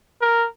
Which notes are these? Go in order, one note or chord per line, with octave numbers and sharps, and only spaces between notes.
A#4